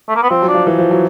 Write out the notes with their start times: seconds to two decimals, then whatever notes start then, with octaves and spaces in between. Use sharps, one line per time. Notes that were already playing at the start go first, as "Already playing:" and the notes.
0.09 A3
0.16 A#3
0.23 B3
0.30 F3 C4
0.42 F#3
0.48 D4
0.54 F3
0.67 E3
0.78 F3
0.91 F#3